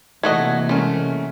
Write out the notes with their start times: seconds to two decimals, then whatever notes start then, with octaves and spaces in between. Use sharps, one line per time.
0.23 C3 E3 A3 A#3 F#4 D#5 G#6
0.69 G#3 A3 C#4 A#4